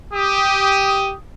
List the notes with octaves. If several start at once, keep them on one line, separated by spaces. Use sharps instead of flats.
G4 D#6